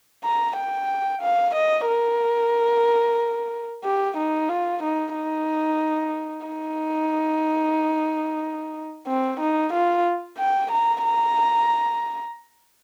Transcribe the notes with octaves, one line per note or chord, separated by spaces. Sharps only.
A#5
G5
F5
D#5
A#4
G4
D#4
F4
D#4
D#4
D#4
C4
D#4
F4
G5
A#5
A#5